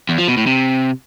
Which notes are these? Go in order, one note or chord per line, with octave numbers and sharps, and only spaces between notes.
E2
F3
B2
A2
C3